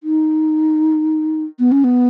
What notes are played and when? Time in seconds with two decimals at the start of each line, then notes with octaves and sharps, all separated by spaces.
0.03 D#4
1.59 B3
1.72 C#4
1.84 B3